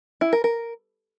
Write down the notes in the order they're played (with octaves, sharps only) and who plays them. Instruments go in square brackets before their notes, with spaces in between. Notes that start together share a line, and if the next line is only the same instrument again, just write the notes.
[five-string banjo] E4
A#4
A#4